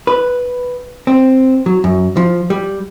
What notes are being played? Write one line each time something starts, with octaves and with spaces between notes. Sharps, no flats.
B4
C4
F#3
F#2
F3
G3